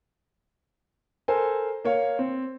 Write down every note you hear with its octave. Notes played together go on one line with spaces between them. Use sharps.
A4 A#4 C5 G#5
A#3 C#5 F5
C4